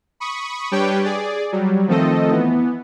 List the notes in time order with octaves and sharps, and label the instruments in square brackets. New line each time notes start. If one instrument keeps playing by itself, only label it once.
[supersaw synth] B5 C#6 D#6
G3 D4 G4 B4 C#5 G5
G#4 D5
F#3 G3
D#3 F3 A3 C4 A4 D#5
E3 B3